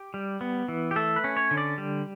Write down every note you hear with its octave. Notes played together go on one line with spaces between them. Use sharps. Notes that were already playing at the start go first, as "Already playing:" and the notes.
Already playing: G4
G3
B3
E3
G4
A3 A4
B4
C#4
C#5
D3
D5
G3